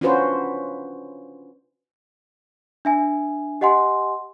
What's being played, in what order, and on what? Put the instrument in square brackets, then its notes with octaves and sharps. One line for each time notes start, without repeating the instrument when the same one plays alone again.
[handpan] C#4 D4 F4 F#4 B4 C5
[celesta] D4 E5 G#5
G4 D#5 F#5 G#5 C6